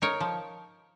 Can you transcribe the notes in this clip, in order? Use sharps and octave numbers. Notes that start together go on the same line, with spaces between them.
D#4 A#4 C#5
F3